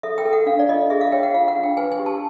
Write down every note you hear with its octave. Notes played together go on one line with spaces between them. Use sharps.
A4 E5
G5
A4
F#5
D4 F5
D5
F4 D#5
G#4 E5
F5
C#5 G5
F#5
F4 F5
F#5
D4
G5
B4 G#5
G#5
G4
A5